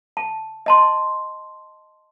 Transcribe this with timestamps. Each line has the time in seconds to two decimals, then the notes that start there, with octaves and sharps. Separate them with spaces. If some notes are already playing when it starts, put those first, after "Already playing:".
0.17 A5
0.66 D#5 A5 C6